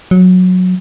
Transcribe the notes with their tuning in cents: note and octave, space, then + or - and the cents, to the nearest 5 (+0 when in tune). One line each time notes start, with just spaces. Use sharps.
F#3 -15